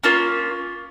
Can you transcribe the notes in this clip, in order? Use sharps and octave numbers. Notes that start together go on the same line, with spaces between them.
A#3 C#4 F4